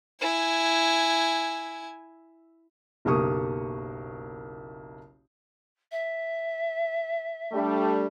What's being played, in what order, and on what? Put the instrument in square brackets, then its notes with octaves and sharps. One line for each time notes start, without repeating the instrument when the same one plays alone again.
[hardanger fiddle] E4 G#5
[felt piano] F#1 B1 A#3 G4 C#6 D#6
[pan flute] E5
[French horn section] G3 A3 D4